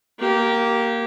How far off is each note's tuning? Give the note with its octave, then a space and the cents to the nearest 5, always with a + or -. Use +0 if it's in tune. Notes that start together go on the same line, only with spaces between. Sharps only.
A#3 +0 G4 -20